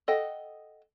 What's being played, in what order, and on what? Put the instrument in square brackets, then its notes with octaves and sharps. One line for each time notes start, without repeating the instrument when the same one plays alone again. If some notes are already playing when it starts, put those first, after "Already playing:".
[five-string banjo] A4 D#5 F#5 G5